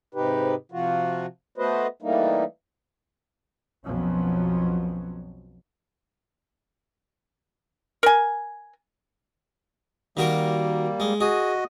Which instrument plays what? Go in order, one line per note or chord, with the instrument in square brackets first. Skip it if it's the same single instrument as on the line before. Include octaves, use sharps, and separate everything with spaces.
[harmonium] G#2 C3 D#4 G4 B4
C3 F3 F4 F#4
A3 B3 F#4 B4 C5 D#5
E3 G3 A3 A#3 D#4
[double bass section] B1 F2 F3 F#3 B3 C#4
[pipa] A#4 G#5
[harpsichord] D#3 F#4 A#4 [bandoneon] G3 A#3
[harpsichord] G#3
[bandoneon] F#4 D#5 [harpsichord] G#4